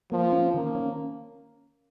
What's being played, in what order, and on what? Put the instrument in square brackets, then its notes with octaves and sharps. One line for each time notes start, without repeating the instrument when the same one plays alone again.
[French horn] F3 [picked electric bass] A#3
[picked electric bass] C#4
[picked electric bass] D#3 [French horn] A#3
[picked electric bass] C#4